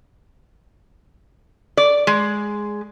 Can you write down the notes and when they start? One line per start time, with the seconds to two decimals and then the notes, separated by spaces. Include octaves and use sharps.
1.77 D5
2.07 G#3